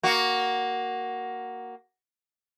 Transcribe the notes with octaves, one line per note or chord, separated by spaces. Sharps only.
A#3 F#4